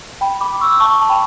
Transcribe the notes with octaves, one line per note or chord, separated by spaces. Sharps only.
G5 B5
B5 D6
C#6 E6
A5 C#6
A5
G5 B5